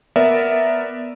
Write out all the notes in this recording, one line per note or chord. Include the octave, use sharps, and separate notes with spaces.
B3 A#4 D5 E5